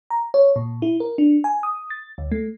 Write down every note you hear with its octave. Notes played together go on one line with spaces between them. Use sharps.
A#5
C#5
A#2
E4
A#4
D4
G#5
D#6
A6
D2
A3